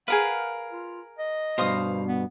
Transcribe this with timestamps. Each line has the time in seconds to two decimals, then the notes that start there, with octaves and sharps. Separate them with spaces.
0.08 G#4 A#4 B4 F5 F#5
0.72 F4
1.19 D#5
1.58 G2 B2 C5 F5 D#6
2.08 B3